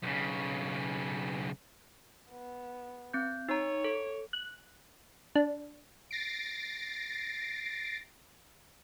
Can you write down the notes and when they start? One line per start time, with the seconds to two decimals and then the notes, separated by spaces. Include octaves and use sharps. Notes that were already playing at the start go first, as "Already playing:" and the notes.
0.02 B1 C#3
2.31 B3
3.14 C4 G6
3.49 D#4 C#5 A#5
3.84 A4
4.33 F#6
5.35 D4
6.11 A6 A#6 C7 D7